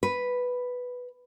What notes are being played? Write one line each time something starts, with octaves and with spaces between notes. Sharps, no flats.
B4